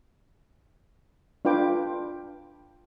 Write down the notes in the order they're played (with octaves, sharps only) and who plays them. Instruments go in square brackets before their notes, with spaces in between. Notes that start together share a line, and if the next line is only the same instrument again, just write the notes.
[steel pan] D4 F4 B4 G5 D6